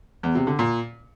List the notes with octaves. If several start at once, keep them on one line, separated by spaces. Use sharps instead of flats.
E2
C3
D3
A#2